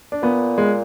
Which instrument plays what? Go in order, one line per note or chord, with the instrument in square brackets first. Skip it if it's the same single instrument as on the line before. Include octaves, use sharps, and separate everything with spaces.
[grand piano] D4
[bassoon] A#2 [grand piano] B3
[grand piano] G#3